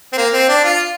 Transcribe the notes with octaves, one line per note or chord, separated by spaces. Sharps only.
C4
A#3
C4
D4
F4